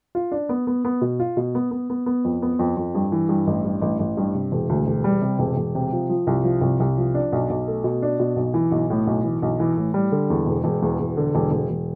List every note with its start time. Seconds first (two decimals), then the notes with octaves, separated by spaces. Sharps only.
0.15 F4
0.32 D4
0.49 B3
0.67 B3
0.85 B3
1.01 B2
1.20 F4
1.37 B2
1.55 B3
1.71 B3
1.90 B3
2.06 B3
2.24 F2
2.42 B3
2.59 F2
2.77 F2
2.95 G2
3.12 E3
3.29 G2
3.47 A1
3.65 G2
3.82 A1
3.99 A1
4.17 G2
4.35 C3
4.52 E1
4.69 D2
4.87 E1
5.04 G3
5.21 C3
5.39 E1
5.57 E1
5.75 C3
5.92 F3
6.09 F3
6.27 C2
6.44 F3
6.61 C2
6.80 C2
6.98 F3
7.15 D4
7.33 B1
7.50 B1
7.68 A3
7.84 B2
8.02 D4
8.20 B2
8.36 B1
8.54 E3
8.72 B1
8.90 A2
9.07 B1
9.24 E3
9.42 B1
9.60 E3
9.77 A2
9.94 G3
10.12 D3
10.30 E2
10.46 E1
10.64 E1
10.82 E2
11.00 E1
11.17 D3
11.35 E1
11.52 E1
11.70 E1